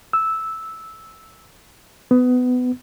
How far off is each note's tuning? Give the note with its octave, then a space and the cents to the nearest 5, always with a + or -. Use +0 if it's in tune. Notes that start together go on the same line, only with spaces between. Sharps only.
E6 -10
B3 +20